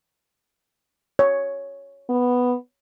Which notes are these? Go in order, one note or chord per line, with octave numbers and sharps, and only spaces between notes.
C#5
B3